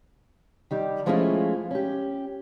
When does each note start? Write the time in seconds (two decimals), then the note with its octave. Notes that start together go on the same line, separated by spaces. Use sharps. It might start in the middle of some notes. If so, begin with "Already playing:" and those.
0.71 D#3 G3 G4
1.06 F3 G#3 A3 C#4 E4 F4
1.71 C#4 G4